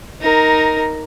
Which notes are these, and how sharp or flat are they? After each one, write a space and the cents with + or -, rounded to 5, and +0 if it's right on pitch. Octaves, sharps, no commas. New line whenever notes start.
D#4 +10 A#4 +0